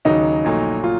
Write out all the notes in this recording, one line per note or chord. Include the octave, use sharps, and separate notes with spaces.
D#2 C#3 F#3 D#4
A#1 A#2 F#3 A3
F4